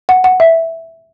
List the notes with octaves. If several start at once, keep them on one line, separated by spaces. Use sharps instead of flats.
F#5
F#5
E5